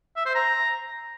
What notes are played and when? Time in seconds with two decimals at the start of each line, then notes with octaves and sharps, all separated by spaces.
0.16 E5
0.26 C5
0.35 A#5